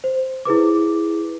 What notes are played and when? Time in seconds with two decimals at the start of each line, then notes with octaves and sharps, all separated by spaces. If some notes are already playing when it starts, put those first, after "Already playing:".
0.04 C5
0.45 E4 G#4 B4 D6